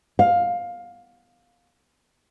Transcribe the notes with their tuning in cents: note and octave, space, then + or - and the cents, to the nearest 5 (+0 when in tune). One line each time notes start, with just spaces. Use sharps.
F5 +15